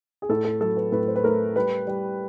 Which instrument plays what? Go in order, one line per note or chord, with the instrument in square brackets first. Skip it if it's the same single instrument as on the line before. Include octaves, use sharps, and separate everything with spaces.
[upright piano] G#4
A2 A4
A4
F#3 A4
B4
A2 B4
C5
B4
A3 A#4
G3 B4
G3